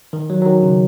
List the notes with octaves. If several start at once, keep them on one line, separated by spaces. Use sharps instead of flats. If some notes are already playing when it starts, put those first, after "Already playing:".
D#3
F#3
F#3
D#3
C#3